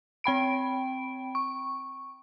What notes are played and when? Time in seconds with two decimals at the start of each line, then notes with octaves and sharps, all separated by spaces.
0.24 C4 G5 B5 D7
1.35 C#6